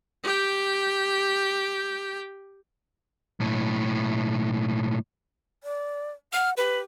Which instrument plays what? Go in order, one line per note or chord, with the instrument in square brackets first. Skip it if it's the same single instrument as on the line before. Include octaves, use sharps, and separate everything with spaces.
[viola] G4 G5
[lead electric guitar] B1 A2
[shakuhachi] D5
[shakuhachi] F#5 [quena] F6
[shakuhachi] G4 [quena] B4